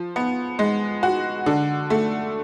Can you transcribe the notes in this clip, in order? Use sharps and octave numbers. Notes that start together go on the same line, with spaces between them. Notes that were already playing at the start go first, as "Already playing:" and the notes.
Already playing: F3
B3
G#3
F#4
D3
A3